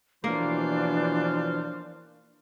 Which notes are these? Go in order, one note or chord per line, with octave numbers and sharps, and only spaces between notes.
B2 E3 F3 A#3 D4 C5 C#5 F5